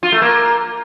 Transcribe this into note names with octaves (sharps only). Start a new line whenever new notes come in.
F4
A3
A#3